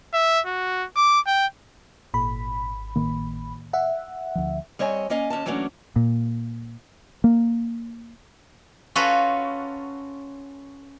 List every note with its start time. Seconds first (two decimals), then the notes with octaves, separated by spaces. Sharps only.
0.13 E5
0.46 F#4
0.96 D6
1.27 G5
2.14 G#1 A#2 B5
2.96 A2 D#3 A#3
3.73 E5 F#5
4.35 D2 F3
4.79 G3 C4 C#5 D#5 G#5
5.10 A#3 C#4 D#5 F5 G#5
5.30 D#2 C#4 D#5 A5
5.46 E3 F#3 A3 A#3 C#4 D4
5.96 A#2
7.24 A#3
8.95 C#4 F4 F#4 A4 B4